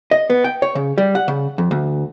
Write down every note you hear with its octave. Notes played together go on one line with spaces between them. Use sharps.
D#5
B3
G5
C#5
C#3
G3
F#5
C#3
F2
D2